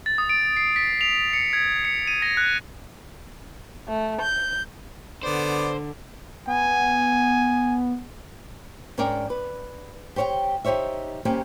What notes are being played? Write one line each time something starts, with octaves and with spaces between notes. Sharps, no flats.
A6
D#6
D7
C7
B6
F7
C#7
G#6
C#7
D#7
A#6
F#6
A3
G6
D3 B3 C5 D5
B3 G#5
G#2 C#4 D4 A#4 D5 G5
B4
G4 C5 C#5 F#5 G5
D#4 G4 C5 C#5 E5
G3 A#3 C4 C#4 G4